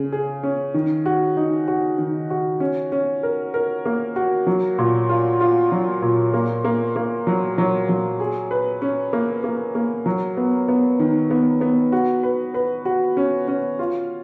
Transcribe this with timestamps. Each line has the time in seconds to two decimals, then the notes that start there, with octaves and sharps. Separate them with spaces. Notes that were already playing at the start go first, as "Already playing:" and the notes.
Already playing: C#3 G#4
0.13 G#4
0.43 C#4
0.74 D#3
1.06 F#4
1.37 D#4
1.68 F#4
1.98 D#3
2.30 F#4
2.60 C#4
2.92 C#4
3.23 A#4
3.54 A#4
3.85 A#3
4.16 F#4
4.47 F#3
4.78 A#2
5.09 F4
5.41 F4
5.72 F#3
6.02 A#2
6.34 A#3
6.65 A#3
6.96 A#3
7.27 F#3
7.58 F#3
7.89 F#3
8.20 G#4
8.51 B4
8.82 C#4
9.13 A#3
9.44 A#3
9.75 A#3
10.06 F#3
10.37 B3
10.68 B3
11.00 D#3
11.31 B3
11.61 B3
11.92 F#4
12.23 B4
12.54 B4
12.85 F#4
13.17 C#4
13.48 C#4
13.79 F4